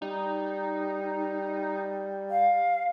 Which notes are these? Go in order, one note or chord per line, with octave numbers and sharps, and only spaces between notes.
G3 D#4
F5